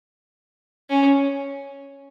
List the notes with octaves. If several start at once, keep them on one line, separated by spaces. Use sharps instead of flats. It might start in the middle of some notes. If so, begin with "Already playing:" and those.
C#4